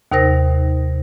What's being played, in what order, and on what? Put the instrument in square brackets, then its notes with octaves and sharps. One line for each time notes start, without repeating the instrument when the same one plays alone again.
[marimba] D#2 C3 D#4 A#4 C5 A#6